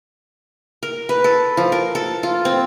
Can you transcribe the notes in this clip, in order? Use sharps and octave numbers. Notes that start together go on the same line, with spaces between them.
A#4
B4
A4
F3
A#4
A4
F4
C4